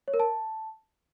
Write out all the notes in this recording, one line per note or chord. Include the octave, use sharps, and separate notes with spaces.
C#5
A#4
A5